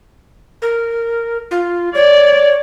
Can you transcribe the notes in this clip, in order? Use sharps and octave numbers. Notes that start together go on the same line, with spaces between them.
A#4
F4
C#5 D5